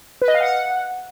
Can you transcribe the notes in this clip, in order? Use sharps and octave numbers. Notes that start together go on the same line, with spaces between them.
B4
D#5
F5
F#5